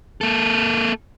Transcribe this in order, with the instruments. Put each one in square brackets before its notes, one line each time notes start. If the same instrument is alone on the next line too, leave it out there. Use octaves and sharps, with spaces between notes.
[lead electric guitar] A#3 A4